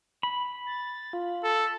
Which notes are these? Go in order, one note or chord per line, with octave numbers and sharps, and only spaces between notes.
B5
A6
F4
A4